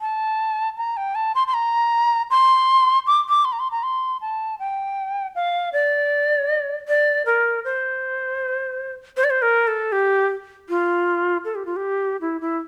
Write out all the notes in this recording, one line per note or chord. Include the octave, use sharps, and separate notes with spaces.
A5
A#5
G5
A5
C6
C6
A#5
C6
D6
D6
C6
A#5
C6
A#5
C6
A5
G5
F5
D5
D5
A#4
C5
C5
D5
C5
A#4
A4
G4
F4
A4
G4
F4
G4
E4
E4